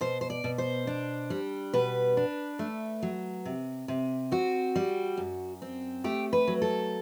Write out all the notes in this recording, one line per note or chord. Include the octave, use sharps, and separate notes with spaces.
B2 C5
C5
D5
B2
C5
D4
G3
B2 B4
D4
A3
F#3
C3
C3
C4 F#4
G3
F#2
C4
A3 G4
B4
F#3
A4